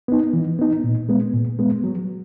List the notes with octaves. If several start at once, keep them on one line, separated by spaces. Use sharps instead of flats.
B3 D#4
E3
B3 D#4
A#2
G#3 B3
A#2
G#3 B3
F#3